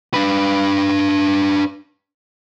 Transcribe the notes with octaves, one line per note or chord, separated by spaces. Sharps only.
D4 B4